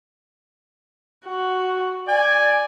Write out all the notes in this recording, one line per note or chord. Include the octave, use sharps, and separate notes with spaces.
F#4
D5 G#5